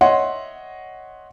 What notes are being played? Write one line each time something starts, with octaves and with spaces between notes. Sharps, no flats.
C#5 D#5 E5 F#5 C6